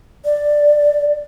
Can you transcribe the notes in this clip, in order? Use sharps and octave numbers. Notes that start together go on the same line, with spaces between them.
D5